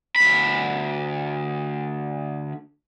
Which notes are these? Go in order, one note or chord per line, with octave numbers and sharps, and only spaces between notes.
D2 B5